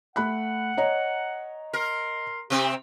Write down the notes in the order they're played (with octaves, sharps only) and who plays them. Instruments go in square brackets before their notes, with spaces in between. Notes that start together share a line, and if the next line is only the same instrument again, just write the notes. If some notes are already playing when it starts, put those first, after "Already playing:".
[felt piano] A3 B5 F#6 [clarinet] F#5
[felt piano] C#5 D#5 A#5
[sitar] A#4 [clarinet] C6
[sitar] C3 C4 [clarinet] G4